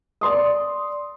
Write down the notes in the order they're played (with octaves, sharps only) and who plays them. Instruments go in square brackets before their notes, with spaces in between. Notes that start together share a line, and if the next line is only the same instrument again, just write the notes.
[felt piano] D5 C6 D#6